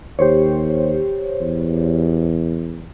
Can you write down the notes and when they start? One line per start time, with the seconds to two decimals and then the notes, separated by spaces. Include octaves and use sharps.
0.19 D#2 G4 C5 C#5
1.41 E2